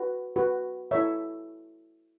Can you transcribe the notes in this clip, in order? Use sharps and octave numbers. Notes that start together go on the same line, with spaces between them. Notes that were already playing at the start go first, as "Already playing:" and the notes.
Already playing: F#4 B4
F#4 B4
E4 A4 C#5 E5